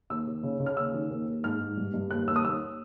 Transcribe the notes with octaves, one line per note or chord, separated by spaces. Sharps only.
D#2 E6
D#2
C#3
C#3
F6
D#2 E6
D#3
D#2
D#2
G#2 F6
G#2
G2
G2
D#2 F#6
D#2 E6
D#6
D#2 E6